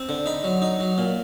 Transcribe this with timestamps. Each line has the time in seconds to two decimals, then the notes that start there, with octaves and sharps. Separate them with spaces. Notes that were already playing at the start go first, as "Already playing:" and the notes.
Already playing: C4
0.09 D3
0.26 D#4 B5
0.44 F#3
0.62 D#4
0.80 F#3
0.98 A#2